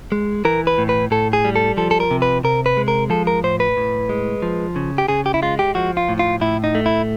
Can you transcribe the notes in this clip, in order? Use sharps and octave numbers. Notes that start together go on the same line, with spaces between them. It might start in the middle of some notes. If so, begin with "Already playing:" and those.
G#3
E3 A#4
B4
A2
B4
A2 A4
G#4
G3
A4
F3 A4
A4
A#4
C3
B4
C3 A#4
B4
G#3
A#4
F3 A4
A#4
A2 C5
B4
A2
G#3
F3
C#3
G4
C#3 G#4
G4
E4
G#3 F4
G4
F3 F#4
F4
A2
F4
A2 E4
D#4
A3
E4